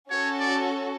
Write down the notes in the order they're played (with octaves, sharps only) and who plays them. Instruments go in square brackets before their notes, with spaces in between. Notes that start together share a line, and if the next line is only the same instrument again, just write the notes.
[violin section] C#4 F#4 A4 [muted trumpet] C#5
[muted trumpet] D5